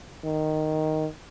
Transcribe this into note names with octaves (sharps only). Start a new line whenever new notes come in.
D#3